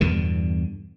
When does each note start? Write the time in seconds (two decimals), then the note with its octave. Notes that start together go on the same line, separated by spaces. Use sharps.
0.01 E2 G2 B2 D3